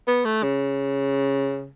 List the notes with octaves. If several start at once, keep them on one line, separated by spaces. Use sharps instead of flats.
B3
A3
C#3